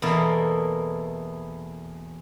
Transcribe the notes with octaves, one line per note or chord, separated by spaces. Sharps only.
E2 B2 A#3 E4 A4 D5